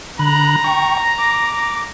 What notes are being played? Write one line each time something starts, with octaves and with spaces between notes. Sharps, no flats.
D3 A#5 B5 F#6
G5 C#6
D6